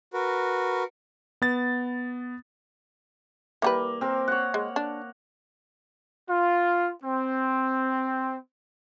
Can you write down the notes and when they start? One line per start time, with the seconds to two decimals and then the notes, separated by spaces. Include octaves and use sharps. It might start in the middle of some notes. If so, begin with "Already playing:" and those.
0.14 F#4 A#4 B4
1.42 B3 A6
3.62 E3 G3 A#3 B4
4.01 C4 A#4
4.28 C#5 F#5
4.54 G#3
4.76 D4
6.29 F4
7.04 C4